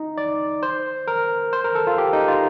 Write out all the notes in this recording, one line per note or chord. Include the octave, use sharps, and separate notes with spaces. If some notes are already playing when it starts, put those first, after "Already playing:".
Already playing: D#4
D5
C5
A#4
C5
A#4
A4
F4
G4
D#4
F4